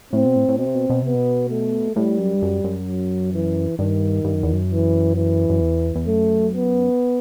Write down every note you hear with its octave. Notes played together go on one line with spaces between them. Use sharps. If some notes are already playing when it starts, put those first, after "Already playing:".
A2 C4
B2
A2
A2
B2 C4
C3
B2
B2
C3 B3
B2
A3
A2 G3
F#2
G2
F#2
F#2
F#3
E3
G2 D#3
G2
F#2
E2
F#2
E3
E3
F#2
E2
E2
F#2 A3
B3